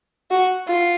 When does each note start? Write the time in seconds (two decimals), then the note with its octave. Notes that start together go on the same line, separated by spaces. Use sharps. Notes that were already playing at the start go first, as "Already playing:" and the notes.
0.31 F#4
0.67 F4